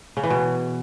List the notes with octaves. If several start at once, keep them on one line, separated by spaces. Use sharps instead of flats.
C#3
E3
B2